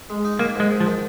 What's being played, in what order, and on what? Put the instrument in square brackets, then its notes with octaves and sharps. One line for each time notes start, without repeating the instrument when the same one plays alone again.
[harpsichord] G#3
D#4
[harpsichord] D#3 [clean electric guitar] A#3
[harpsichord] G#2 [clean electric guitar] G#3
[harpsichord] G#2
[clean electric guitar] F3
[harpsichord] D#3